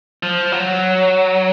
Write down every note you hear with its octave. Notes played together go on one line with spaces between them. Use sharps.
F3
F#3